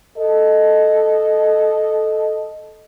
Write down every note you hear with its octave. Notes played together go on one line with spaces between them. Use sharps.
A4 D#5